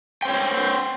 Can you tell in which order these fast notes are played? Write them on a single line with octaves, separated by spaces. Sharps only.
G5 C5 C#5